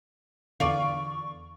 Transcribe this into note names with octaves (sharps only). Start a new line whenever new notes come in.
E2 D3 F4 D5 C#6